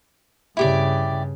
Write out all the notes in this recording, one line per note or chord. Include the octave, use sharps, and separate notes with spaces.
G2 C#3 E4 G4 D5